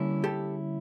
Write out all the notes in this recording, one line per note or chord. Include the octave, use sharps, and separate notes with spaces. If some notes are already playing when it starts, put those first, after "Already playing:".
Already playing: D3 G3 A#3 C#4 E4
G4 A4